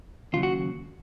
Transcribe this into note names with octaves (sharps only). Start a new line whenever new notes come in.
D#2 C#3 F#3 F4
F#4